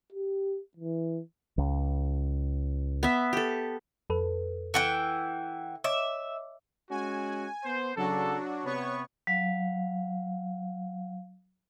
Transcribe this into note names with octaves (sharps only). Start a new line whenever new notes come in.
G4
E3
C#2
B3 E5
G4 A4
F2 A4 B4
E3 A4 F#5 G5
C#5 D#5 E5 D6
G#3 C#4 F#4 G#5
B3 C5
C#3 F#3 D4 F#4 A4
C3 B3 C#5 C#6
F#3 F5